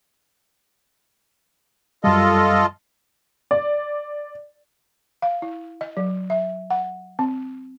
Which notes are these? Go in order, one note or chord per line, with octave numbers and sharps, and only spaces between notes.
F#2 G3 F4 A4 D#5
D5
F5
E4
D#5
F#3
E5
F#5
C4